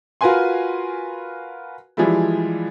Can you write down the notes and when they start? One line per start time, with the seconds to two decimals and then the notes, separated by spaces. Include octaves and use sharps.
0.21 F4 F#4 A#4 B4 G#5 C6
1.97 E3 F3 G3 G#3 E4